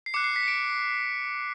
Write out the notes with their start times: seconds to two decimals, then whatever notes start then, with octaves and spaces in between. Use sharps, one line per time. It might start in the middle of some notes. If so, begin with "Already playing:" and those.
0.06 C7
0.14 D6 F#6 C#7
0.24 C7
0.36 B6
0.43 C#7
0.48 D7